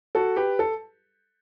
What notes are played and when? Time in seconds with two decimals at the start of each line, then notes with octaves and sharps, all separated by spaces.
0.15 F#4 A4
0.36 G4 B4
0.59 A4